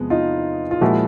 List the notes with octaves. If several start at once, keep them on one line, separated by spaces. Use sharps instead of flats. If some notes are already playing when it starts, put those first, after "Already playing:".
Already playing: E2 C3 F3 G#3 B3
D#4 F4
F4
A#2 F3 G#3 E4 F#4